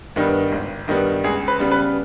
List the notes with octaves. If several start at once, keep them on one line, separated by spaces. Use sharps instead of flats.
G2 D#3 G3 B3
G#1
G2 D#3 G3 B3
C#2 G#4
B4
C#3 G3 B3
B4